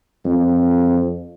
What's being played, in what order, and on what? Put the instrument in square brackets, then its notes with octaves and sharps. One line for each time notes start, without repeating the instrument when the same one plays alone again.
[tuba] F2